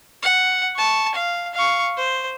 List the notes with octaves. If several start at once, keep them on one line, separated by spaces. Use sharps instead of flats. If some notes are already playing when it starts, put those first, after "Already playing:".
F#5
A5 C#6
F5
F5 C#6
C5